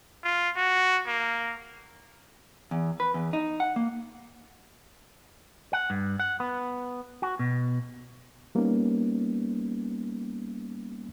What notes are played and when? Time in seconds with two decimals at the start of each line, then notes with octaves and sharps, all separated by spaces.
0.23 F4
0.56 F#4
1.07 A#3
2.71 E2
3.00 B4
3.14 E2
3.33 D#4
3.60 F#5
3.76 A#3
5.73 F#5
5.90 G2
6.20 F#5
6.40 B3
7.22 F#4
7.39 B2
8.55 G3 A#3 B3 C#4 D#4